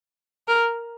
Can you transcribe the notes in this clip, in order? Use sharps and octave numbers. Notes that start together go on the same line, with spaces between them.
A#4